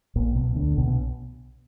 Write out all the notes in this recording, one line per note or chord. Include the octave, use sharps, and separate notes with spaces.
A#1 A#2
B1 B2
D2 D3
B1 B2
B2